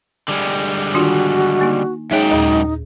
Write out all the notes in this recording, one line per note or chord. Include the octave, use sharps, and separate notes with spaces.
D3 G3 G#3
D#3 D4 F4 F#4
A#3 D#4
F#2 G#3 D#4 G#4 C#5 E5 G5
D#2 A#2